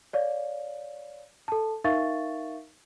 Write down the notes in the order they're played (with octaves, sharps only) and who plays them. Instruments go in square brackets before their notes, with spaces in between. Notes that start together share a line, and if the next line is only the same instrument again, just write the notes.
[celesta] C#5 D5 F5
A4 A5
D#4 A#4 E5 F5 C#6 A6